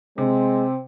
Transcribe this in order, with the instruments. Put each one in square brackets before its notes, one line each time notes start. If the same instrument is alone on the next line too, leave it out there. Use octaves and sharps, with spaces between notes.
[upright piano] C3 [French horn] G#3 [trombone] C4